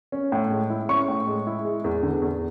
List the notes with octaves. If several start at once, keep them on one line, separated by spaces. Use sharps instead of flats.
C#4
A2
G#3
E4
C#4 C#6
A2
G#3
E4
G#3
E2
D3
E2